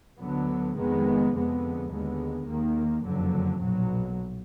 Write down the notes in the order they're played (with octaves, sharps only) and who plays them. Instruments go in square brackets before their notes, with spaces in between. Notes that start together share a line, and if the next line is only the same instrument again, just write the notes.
[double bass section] D2 D3 F#3 B3
F1 F2 D#3 G#3 B3
F2 D3 G#3 B3
D#2 D3 G#3 B3
D#2 D#3 A#3
F#1 F2 D3 F#3
B1 A#2 F#3